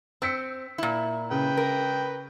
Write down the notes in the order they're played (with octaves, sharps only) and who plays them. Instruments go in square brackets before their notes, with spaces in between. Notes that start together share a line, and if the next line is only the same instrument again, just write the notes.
[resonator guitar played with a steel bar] C4 [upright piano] E6 B6 C#7
[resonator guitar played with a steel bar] A#2 E4
[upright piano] C#3 [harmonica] B4 G5
[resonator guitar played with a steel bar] A#4